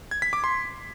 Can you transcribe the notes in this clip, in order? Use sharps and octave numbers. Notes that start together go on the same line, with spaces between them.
G#6
B6
D6
C6